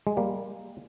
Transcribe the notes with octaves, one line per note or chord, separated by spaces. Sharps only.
G#3
G3 A#3